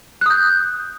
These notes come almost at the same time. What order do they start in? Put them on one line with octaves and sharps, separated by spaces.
F#6 D#6 G6